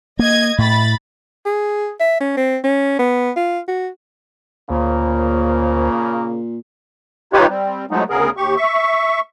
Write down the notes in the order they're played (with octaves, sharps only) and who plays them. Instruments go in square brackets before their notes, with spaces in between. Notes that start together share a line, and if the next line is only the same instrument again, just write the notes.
[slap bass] A#3 [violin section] D#5 G#6
[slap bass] A2 [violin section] B5 A6
[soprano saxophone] G#4
E5
C#4
C4
C#4
B3
F4
F#4
[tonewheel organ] D2 C5 [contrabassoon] A#2 [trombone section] C#3 A#3
[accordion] D#4 F4 G4 B4 C#5
G3 C4
F3 F#3 G#3 A3 B3 D#4
D2 C#3 B3 G#4 A#4
D#2 G4 C#6
E5 C#6